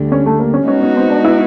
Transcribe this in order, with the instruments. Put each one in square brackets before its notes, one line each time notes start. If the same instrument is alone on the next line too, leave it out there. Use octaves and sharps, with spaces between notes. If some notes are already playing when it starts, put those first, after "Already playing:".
Already playing: [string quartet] D2 D3 G3
[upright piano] C#4
A3
A#3
C#4
[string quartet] G#3 B3 D#4 F#4 B4 [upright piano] C#4
[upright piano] C#4
C4
D4
E4